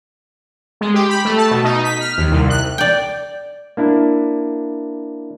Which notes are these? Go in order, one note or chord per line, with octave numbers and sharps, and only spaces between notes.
G#3
G4
B5
A3
A5
B2
D#4
B6
F6
D#2
C2
F#6
D5 G5
A#3 D4 E4